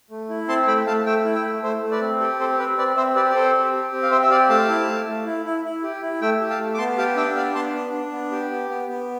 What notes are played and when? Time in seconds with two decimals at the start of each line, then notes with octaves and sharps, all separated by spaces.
0.10 A3
0.29 E4
0.48 C4 A5 C6
0.67 A3 G5 B5
0.86 A3 F5 A5
1.06 A3 E5 G5
1.25 E4
1.35 E5 G5
1.44 A3
1.63 A3 C5 E5
1.82 A3
1.91 B4 D5
2.01 C4
2.20 G4 A4
2.39 C4 A4 C5
2.59 C4 B4
2.78 C4 B4 D5
2.96 C4 C5 E5
3.15 G4 B4 D5
3.30 D5
3.34 C4 A4 C5
3.54 G4
3.73 G4
3.92 C4
4.03 F5
4.11 C4 C5 E5
4.22 E5
4.30 G4 D5 F5
4.49 A3 F5 A5
4.69 E4
4.88 A3
5.07 A3
5.26 E4
5.45 E4
5.65 E4
5.83 G4
6.02 E4
6.21 A3 E5 G5
6.40 G4
6.50 F5 A5
6.59 A3
6.74 D6
6.78 B3 A5 C6
6.98 G4 F5 A5
7.16 D4 E5 G5
7.35 B3 D5 F5
7.55 B3 A5 C6
7.75 D4
7.93 D4
8.12 B3
8.31 G4
8.51 B3
8.69 B3
8.88 B3